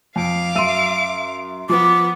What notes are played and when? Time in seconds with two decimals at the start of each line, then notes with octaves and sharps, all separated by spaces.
0.16 F2 F5 D6
0.55 F#2 E5 C6 E6 D#7
1.69 F3 B3 D6